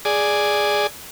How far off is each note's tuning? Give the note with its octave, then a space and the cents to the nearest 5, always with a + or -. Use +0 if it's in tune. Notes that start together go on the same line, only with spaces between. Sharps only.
G#4 +0 D5 +0